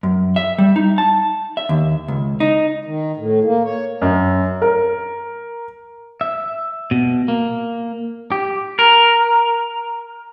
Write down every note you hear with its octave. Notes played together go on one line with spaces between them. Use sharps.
F#2
E5
G3
D#4
A5
E5
D#2
C#2
D#4
D#3
A2
A#3
C#5
F#2
A#4
E5
B2
A#3
G4
A#4